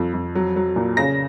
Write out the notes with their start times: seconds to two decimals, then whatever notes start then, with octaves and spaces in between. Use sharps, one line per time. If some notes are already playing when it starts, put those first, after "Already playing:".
Already playing: F2 F3
0.13 F2
0.35 F#3
0.56 F#3
0.76 A#2
0.97 C#3 A#6